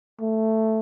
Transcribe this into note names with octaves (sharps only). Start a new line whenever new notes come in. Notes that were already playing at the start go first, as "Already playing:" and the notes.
A3